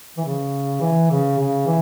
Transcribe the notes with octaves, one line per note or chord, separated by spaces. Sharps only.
E3
C#3
E3
C#3
C#3
E3